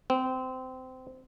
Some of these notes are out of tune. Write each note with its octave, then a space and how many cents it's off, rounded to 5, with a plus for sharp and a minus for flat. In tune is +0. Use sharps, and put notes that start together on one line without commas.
C4 -20